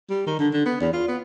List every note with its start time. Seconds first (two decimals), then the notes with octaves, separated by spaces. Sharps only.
0.10 G3
0.27 D#3
0.39 D3
0.53 D3
0.66 B3
0.81 E2
0.93 F4
1.08 B3